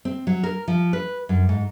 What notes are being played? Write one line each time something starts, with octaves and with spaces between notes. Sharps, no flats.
C4
F#3
A#4
F3
B4
F#2
G#2